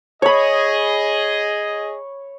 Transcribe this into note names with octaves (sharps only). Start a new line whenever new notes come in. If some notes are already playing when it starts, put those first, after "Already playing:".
G#4 C#5 D#5 B5